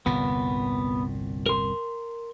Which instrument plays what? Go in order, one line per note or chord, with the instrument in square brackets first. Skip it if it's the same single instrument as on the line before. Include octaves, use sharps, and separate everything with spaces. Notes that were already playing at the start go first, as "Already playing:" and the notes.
[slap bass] G1 C2 A#2 [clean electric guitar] B3
[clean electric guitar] A#4 C6